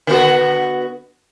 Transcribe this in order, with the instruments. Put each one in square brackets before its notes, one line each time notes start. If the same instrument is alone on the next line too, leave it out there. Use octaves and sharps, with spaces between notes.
[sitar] D3 B3 F#4